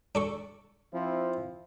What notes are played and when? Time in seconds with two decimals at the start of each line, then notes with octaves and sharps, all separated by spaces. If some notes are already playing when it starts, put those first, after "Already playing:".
0.15 D4 A4 C#6
0.93 F3 C4 E4